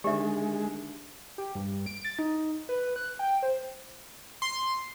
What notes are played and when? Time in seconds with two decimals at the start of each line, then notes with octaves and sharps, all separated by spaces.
0.04 D3 D#3 G#3 D4 G4 E5
1.38 G4
1.55 G2
1.86 D7
2.05 A6
2.19 D#4
2.69 B4
2.96 F#6
3.19 G5
3.43 C5
4.42 C6